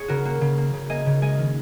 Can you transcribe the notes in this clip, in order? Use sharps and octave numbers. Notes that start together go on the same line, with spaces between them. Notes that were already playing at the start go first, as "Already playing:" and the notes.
Already playing: G#4 C#5
C#3 F#4 A#4
A#3 F#4
C#3
A#3
C#3
A#3 D#5 G#5
C#3
G#3 D#5 G#5
D#3